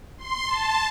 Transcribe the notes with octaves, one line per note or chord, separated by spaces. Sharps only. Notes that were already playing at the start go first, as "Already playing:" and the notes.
C6
A5